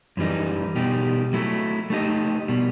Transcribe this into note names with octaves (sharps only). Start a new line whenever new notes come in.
F#2 E3 G3 D#4
B2 G3 D#4 G4
F#3 A3 E4
A3 D#4 G4 D#5
B2 G3